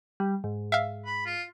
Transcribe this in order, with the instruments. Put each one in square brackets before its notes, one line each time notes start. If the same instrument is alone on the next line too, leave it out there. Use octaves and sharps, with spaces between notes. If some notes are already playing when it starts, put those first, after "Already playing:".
[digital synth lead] G3
G#2
[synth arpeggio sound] E5 F5
[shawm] B5
F4